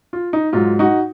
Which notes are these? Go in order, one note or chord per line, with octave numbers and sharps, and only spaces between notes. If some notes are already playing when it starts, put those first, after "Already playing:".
F4
D#4
G#2 F#3 F4
D#4 F#4